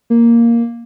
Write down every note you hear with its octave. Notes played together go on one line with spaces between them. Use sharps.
A#3